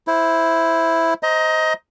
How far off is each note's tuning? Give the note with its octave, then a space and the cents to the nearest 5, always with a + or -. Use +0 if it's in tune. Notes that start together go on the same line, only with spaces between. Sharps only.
E4 +0 C5 +0
C5 -5 D#5 +20 A#5 +0